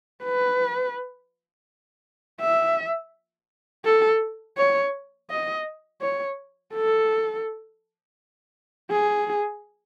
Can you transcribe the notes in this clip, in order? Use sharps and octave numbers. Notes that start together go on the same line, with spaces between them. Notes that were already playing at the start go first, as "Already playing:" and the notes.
B4
E5
A4
C#5
D#5
C#5
A4
G#4